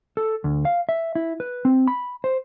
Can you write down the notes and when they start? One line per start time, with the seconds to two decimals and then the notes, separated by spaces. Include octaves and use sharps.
0.17 A4
0.44 D2
0.65 F5
0.89 E5
1.15 E4
1.40 B4
1.65 C4
1.88 B5
2.24 C5